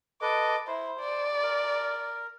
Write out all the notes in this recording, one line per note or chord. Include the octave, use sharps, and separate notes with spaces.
A4 B4 D#5 D6
E4 C5
D5
A#4